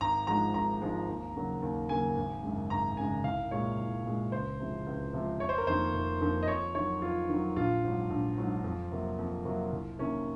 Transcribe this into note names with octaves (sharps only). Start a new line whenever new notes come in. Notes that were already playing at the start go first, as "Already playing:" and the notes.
G#1 A#5
G#2 F3 G#3 A#5
G#1 A#5
G#2 F3 G#3
D#2
C#3 F#3 A#3
D#2
C#3 F#3 A#3 G#5
G#1
F#2 C#3 G#3
G#1 A#5
F#2 C#3 G#3 G#5
C2 F5
A#2 G#3 C#5
C2
A#2 G#3
C#2 C5
C3 F3 G#3
C#2
C3 F3 G#3
F1 C#5
C5
A#4
F2 D#3 A#3 C5
F1
F2 D#3 A#3
D#5
F2 C#5
D#3 F#3 C#5
F2 F4
D#3 F#3
A#1 F4
G#2 F#3
A#1
G#2 F#3
F2
C3 F#3 A#3
F2
C3 F#3 A#3
C2
C3 D#3 A#3 C#4